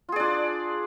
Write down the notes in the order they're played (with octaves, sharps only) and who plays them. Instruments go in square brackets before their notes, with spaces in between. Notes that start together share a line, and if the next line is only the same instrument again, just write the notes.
[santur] F4
G#4
D5
D4